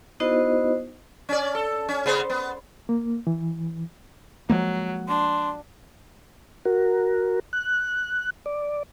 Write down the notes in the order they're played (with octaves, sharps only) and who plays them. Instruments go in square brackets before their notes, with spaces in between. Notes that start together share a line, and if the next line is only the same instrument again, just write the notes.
[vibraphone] B3 D#4 E4 F#4 C5 D#5
[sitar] C#4 D5
A4
C#4
C#3 B3 C5
B3
[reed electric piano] A#3
E3
[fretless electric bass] F3 G#3 A#3 [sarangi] F#3
[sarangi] D4 [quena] C6
[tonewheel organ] F#4 A#4
F#6
D5